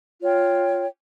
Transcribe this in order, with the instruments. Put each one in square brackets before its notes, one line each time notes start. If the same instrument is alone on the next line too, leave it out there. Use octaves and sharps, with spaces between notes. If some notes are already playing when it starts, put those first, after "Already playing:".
[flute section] F4 C#5 G5